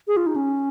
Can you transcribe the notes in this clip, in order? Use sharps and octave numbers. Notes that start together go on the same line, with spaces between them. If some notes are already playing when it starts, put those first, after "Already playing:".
G#4
F4
D#4
C#4